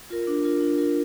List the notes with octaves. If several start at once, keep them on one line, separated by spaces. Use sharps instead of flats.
F4 A#4
D4
F4 A#4
D4
F4 A#4